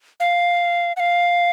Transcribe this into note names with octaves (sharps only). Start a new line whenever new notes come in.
F5
F#5
F5